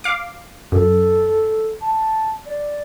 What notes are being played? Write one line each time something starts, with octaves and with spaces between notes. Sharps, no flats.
F5 D6
F#2 A4
A5
D5